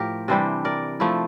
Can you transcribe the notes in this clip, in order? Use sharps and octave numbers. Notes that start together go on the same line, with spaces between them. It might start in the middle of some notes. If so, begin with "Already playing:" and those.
Already playing: A2 F3 F4 G4 A#4
C3 E3 G3 D4 A4 C5
A#4 D5
F3 A3 E4